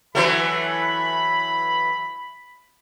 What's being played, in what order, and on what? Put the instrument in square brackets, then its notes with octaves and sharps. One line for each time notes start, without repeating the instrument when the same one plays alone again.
[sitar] E3 F#3 A3 [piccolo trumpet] B5